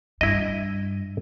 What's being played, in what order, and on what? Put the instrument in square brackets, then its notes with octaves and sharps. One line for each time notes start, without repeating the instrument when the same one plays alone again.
[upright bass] G2 [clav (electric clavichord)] E4 D#5